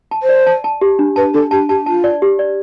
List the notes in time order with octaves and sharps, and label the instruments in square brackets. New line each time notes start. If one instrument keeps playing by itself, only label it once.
[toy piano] A5
[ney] C5
[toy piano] D5
A5
A5
G4
D4
[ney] B4 [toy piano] A5
[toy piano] D4 [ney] A4
[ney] G4 [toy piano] A5
[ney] G4 [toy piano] A5
[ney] F4 [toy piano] A5
[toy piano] D5
G4
D5